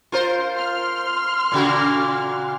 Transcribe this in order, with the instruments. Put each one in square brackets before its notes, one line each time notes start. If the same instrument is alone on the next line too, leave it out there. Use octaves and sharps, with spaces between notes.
[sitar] F4 A#4 C5
[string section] C6 F6
[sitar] A#2 C#3 F#4